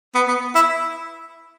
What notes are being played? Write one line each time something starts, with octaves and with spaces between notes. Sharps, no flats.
B3
B3
E4